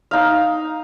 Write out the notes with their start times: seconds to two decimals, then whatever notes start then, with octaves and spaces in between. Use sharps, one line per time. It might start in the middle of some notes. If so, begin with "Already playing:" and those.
0.11 D#4 F5